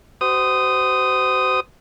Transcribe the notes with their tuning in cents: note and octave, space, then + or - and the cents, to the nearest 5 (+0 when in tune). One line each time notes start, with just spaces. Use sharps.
F#4 +40 C5 -25 D#6 +0